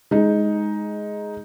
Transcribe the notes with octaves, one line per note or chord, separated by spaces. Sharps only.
G#3 D#4